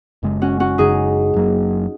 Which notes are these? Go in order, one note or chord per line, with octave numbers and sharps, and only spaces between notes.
F#1 F#2 C#3 G#3
C#4 F#4
C#4 F#4
F#1 F#2 C#3 G#3 D#4 G#4
F#1 F#2 F#3 A#3